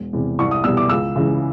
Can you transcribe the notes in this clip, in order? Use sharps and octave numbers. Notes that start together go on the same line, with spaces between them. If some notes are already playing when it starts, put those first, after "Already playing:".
Already playing: E1
E2 C3
C2 C#6
D#6
B2 G3 E6
D6
C#2 E6
C#3 E3 G#3